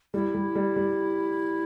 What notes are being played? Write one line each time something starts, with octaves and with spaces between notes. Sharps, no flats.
G3 E4
G3
G3
G3